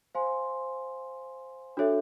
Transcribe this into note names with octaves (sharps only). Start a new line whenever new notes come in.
C5 F5 G#5 C6
D4 F#4 A4 C#5 E5